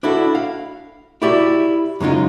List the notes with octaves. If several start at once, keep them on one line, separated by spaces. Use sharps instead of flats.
D4 E4 F#4 A4
F5
E4 F#4 G4 D5 E5
F#2 C#3 G#3 D#4 F4